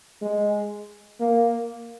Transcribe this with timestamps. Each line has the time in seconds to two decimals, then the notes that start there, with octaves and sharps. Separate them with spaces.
0.21 G#3
1.20 A#3